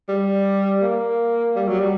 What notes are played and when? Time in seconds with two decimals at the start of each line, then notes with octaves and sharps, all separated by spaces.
0.09 G3
0.82 A#3
1.56 G3
1.68 F#3
1.80 G3